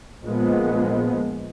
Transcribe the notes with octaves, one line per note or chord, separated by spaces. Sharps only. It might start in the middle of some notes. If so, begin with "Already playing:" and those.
A#1 A#2 F3 G#3 B3